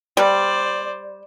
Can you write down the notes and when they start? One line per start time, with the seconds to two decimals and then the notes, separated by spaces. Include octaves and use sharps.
0.17 G3 C5 D5